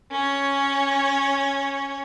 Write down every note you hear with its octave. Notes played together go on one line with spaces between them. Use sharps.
C#4 C#5